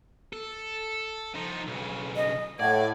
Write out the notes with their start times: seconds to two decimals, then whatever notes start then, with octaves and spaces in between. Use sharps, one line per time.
0.33 A4
1.34 F3 D#4
1.67 B1 C#3
2.16 D#5
2.60 A2 D5 F#5 G#6